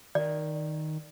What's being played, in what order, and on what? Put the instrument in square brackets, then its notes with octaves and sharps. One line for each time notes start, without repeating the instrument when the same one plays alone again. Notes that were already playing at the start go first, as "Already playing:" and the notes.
[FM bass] D#3 [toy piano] D5